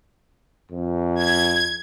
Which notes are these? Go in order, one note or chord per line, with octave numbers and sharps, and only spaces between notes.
F2
G#6